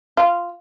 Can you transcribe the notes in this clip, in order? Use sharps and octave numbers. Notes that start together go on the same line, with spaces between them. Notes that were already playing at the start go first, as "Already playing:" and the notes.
F4